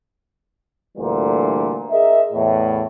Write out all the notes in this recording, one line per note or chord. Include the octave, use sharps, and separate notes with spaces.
D2 A#2 D3 E3 G3
G#4 A#4 D#5 E5
E2 A2